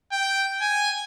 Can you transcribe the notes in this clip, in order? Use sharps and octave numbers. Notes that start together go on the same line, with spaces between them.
G5
G#5